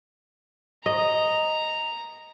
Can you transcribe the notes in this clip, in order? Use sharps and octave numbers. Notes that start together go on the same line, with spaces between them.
D#5 A#5